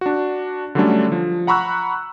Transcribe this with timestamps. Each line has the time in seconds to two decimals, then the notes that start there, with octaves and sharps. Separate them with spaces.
0.01 D4 F#4
0.75 D3 F#3 G3 A3 C#4 D4
1.12 F3
1.47 F#5 A#5 B5 C#6 E6 F#6